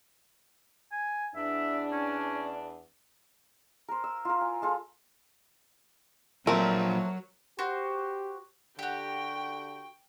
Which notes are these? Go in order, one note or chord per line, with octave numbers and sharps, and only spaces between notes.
G#5
E2 D4 E5
C#4
A#4 C5
E6
F4 A#4
G#5
G#3 F4 A4
A#2 F3 F#3 A3 C4 A#4
F#4 G4 C5
D3 F#4 G4 G5